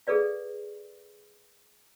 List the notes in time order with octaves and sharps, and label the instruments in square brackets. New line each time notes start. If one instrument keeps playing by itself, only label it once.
[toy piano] G#4 A4 B4 D5 F5